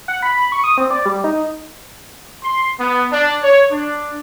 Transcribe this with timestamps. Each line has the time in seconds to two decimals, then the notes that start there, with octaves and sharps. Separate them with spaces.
0.08 F#5
0.23 B5
0.36 B5
0.52 C#6
0.64 D#6
0.77 C4
0.91 D5
1.06 G3
1.24 D#4
2.44 C6
2.79 B3
3.11 D4
3.43 C#5
3.71 D4